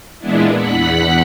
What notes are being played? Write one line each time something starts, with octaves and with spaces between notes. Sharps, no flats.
A#2 E3 G#3 B3 D4 E4
E2 F#5 F#6 B6